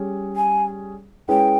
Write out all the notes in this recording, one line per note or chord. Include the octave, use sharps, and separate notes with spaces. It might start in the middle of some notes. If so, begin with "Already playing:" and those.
Already playing: G3 C#4 G#4
G#5
G#3 C#4 E4 G#4 B4 G5